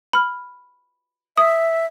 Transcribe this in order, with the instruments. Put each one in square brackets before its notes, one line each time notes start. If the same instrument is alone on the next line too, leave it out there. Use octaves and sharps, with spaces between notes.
[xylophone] B5 F6
[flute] E5 [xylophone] D#6